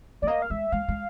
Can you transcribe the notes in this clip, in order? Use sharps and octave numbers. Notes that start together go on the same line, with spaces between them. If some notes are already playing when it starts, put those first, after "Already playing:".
A3 D5
A#3 D#5
F5
G#3 E5
G#3 F5
G#3